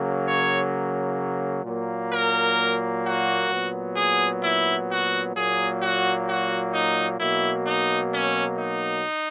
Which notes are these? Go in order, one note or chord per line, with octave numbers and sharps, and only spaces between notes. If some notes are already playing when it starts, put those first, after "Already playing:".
Already playing: C#3 F#3 A#3
C#5
A#2 F#3 A#3
A#4
F#4
A#2 F#3 B3
G#4
E4
F#4
A#2 F#3 A#3 G#4
F#4
F#4
D#4
B2 F#3 A#3 E4
D#4
C#4
D#4